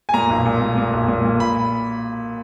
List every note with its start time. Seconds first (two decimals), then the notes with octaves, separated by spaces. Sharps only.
0.09 G#5
0.14 A#2 A#5
0.30 B1
0.45 A#2
0.61 A#2
0.78 A#2
0.93 B1
1.08 A#2
1.25 A#2
1.40 B5